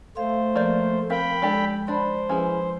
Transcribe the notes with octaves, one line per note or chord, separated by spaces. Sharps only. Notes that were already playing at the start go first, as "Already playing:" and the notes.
A3 C5 F5
F3 A#3 D5 G6
C4 A#4 F5 G5 B5
G#3 D4 G4 A4
D4 C5 D5 A5 B5
F3 C#4 E4 G#4 B4